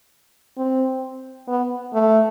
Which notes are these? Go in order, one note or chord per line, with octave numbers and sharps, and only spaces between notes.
C4
B3
A3